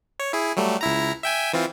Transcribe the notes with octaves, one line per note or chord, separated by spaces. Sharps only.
C#5
E4 G#4
F#3 G3 A3
C#2 E4 A#5
E5 G5 G#5
E3 C4 F4